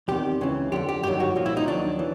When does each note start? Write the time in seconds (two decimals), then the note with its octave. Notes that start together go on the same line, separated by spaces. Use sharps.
0.08 E2 C3 D#3 G4
0.41 C#2 C#3 E3
0.72 F2 D3 F3 G4
0.89 G4
1.03 G2 D#3 F#3 G4
1.20 F#4
1.36 C2 A#2 F3
1.46 E4
1.57 D#4
1.67 D#2 D#3 F#3 D4
1.99 E3